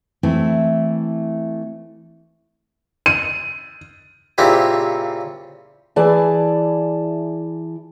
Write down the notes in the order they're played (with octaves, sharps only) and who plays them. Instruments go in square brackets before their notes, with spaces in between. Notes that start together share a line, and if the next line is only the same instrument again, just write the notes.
[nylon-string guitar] E3 A3 C4 E4 F#4
[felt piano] D#7
[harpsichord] A#2 C#3 C4 E4 G4
[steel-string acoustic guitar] E3 E4 G#4 D5 A5